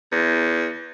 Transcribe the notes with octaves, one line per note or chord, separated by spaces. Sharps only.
E2